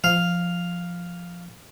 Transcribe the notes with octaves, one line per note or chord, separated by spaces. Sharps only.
F3 F5